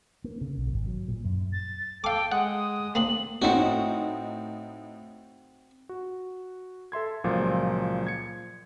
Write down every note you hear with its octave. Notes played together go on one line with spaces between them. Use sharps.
A#3
C#3
B1
G#1
F#3
A#2
F#2
A6
A4 F5 G5 D6
G#3 F#5 D#6
A#3 C4 D4 F#7
A2 C4 D#4 F#4 C#7
F#4
A4 E5 C6 G#6
C#2 A#2 F3 F#3
G#6 C#7